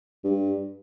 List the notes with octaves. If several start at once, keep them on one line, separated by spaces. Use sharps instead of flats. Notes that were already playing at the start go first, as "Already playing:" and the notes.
G2